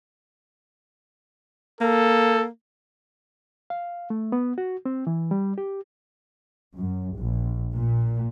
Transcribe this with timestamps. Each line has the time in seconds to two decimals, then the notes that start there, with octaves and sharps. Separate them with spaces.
1.81 A#3 A4
3.70 F5
4.10 A3
4.32 B3
4.58 F#4
4.85 C4
5.07 E3
5.31 G3
5.58 G4
6.75 F#2
7.16 A#1
7.73 A#2